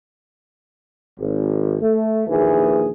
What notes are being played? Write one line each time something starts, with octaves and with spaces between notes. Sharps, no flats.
G#1
A3
A#1 D#2 E3 G#4